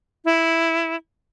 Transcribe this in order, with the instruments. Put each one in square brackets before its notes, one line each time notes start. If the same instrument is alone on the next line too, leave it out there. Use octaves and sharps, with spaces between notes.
[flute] E4